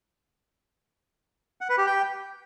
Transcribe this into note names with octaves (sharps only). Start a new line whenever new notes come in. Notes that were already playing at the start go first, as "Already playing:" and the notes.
F#5
B4
G4
G5